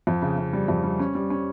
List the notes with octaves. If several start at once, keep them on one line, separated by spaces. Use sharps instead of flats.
F2
C#3
C#3
G3
F2
G3
C#4
G3
C#4